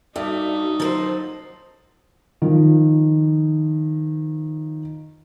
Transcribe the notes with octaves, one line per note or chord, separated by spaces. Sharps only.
G2 D#4 F#4 A4 D5 E5
F3 F#3 A4 A#4 C5
D#3 F3